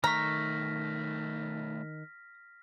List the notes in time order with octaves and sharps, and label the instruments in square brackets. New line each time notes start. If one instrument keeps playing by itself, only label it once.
[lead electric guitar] B1 A3 [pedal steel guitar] D#3 C#6 [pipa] A#5 [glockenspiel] F6 A#6 B6